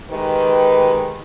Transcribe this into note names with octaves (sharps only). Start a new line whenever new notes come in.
D#3 G#3 G4 B4